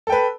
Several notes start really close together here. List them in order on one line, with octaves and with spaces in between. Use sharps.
A4 G5 B4